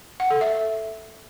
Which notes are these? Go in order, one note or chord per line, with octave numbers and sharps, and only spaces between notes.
F#5
A4
E5